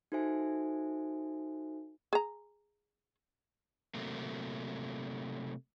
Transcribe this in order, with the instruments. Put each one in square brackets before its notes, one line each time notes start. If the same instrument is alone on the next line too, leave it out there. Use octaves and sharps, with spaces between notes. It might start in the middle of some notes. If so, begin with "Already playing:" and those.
[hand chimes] D#4 F#4 A4 C5 E5 G#5
[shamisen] G#4 A#5
[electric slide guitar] C3 F#3 A3 A#3